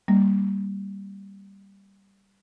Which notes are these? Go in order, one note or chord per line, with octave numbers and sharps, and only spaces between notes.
G3 A#3